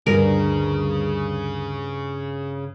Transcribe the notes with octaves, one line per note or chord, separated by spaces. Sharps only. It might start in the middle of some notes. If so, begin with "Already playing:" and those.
D2 G2 C#3 G3 G#4 A#4